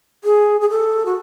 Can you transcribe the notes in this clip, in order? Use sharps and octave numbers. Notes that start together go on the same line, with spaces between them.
G#4
G#4
A4
F#4